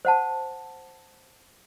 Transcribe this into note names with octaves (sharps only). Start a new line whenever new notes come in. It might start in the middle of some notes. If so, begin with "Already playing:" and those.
C5 F#5 A5